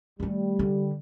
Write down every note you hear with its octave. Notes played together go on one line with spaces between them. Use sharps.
D#3 G3 A3
D3